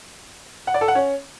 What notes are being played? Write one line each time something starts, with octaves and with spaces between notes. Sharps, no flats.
F#5
D5
A4
F#5
C#4